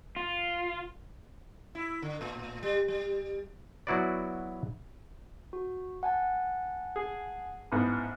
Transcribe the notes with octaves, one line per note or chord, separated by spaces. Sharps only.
F4
E4
D3
A2
G3
G3
F#3 B3 E4 F#4 B4 D5
F#4
F#5 G#5 A5
G#4
A1 G#2 B3